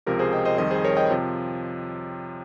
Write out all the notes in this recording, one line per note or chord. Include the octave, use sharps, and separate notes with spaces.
C#2 C3 F3 G4 A#4
G#4 C5
D#5 G5
C5 D#5
F2 D#3 G3 C5 D#5
G#4 C5
A#4 C#5
D#5 G5
C3 F3